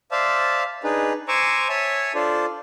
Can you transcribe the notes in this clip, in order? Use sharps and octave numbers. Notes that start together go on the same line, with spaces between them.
C5 D5 E5 F5 A5
D4 D#4 G#4 B4
C5 G#5 A#5 C#6 D6 E6
C#5 E5 G#5 A5
D4 F4 A4 C5 D5